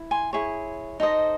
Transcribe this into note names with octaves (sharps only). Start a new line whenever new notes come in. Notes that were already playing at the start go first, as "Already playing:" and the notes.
Already playing: E4
G#5 C6
E4 G#4 C#5
D#4 A4 C5 D#5